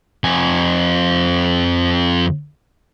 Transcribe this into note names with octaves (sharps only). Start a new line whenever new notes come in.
F2 G#5